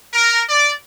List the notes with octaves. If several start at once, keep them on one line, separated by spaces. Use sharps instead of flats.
A#4
D5